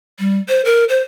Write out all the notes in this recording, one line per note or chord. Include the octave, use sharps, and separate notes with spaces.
G3
C5
A#4
C5